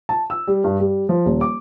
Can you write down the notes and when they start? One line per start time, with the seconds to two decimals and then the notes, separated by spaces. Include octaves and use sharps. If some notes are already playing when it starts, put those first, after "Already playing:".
0.09 A5
0.30 E6
0.47 G3
0.64 G2
0.80 G3
1.09 F3
1.26 D#1
1.41 D6